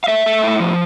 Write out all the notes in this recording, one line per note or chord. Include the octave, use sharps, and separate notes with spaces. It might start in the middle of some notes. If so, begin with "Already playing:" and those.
F5
A3 E5
A3
A2
F3